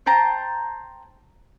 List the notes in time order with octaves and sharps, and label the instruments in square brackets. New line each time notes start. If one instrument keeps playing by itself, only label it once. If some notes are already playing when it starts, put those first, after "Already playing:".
[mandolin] C5 G5 A5 A#5